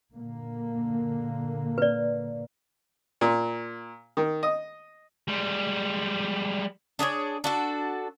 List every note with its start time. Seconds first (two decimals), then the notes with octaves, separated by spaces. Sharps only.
0.15 A#2 D3 A#3
1.78 B4 D5
3.21 A#2
4.17 D#3
4.43 D#5
5.28 G3 G#3
6.99 D4 G#4 A#4 C#5
7.44 D4 F#4 A4